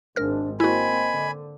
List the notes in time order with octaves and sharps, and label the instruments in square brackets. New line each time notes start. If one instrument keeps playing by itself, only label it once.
[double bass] G#1 G#2 [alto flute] D4 [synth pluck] A#4 F6
[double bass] A#3 C4 [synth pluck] E4 F#4 [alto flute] D#5 [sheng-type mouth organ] G#5 B5
[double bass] D3